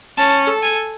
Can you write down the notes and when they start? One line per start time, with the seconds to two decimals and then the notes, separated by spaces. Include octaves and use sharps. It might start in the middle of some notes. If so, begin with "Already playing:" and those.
0.18 C#4 A5
0.47 A4
0.63 G#5